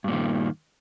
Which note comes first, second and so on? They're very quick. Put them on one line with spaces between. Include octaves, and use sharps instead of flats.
G2 A#2 D#3